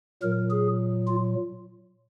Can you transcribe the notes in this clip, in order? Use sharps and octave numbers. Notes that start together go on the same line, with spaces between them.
A#2 F#3 A#4
G#4
F4